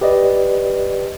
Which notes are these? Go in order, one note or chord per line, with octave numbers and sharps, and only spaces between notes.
G4 B4 D5 D#5